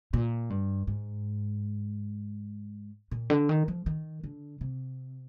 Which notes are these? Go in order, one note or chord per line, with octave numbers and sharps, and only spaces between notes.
A#2
G2
G#2
A#2
D3
D#3
F3
D#3
D3
C3